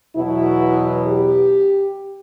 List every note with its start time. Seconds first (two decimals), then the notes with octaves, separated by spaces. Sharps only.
0.16 E2 B2 F#3 B3 E4
1.06 G4